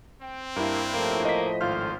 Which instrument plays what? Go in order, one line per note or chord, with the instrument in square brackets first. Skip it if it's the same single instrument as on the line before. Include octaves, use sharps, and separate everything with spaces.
[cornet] C4 [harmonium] G5
[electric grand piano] G2 E4 [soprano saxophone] A#3 [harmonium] D4
[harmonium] A2 F3 A3 [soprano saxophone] A#3
[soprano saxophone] A#3 [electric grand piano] D#5 B6
[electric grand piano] G#1 F4 F6 [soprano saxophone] C5